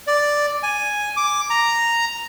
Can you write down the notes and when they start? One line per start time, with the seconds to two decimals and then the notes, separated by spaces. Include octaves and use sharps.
0.07 D5
0.63 G#5
1.17 D6
1.50 A#5